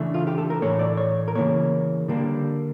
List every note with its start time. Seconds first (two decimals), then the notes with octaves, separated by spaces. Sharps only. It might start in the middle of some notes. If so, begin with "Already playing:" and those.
Already playing: C#3 E3 A3 D4 E5
0.14 F4
0.27 G4
0.38 A4
0.50 A#4
0.62 A2 E3 A3 C#5
0.79 D5
0.97 C#5
1.28 A#4
1.35 C#3 E3 A#3 C#5
2.08 D3 G3 A#3 D4